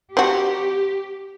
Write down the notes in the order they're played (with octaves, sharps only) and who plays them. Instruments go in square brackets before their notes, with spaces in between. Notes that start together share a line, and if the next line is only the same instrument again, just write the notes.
[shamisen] C4 F#4 [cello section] G4